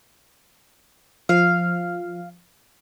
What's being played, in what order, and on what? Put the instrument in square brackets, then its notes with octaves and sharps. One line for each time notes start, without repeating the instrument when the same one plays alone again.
[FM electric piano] F3 [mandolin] F5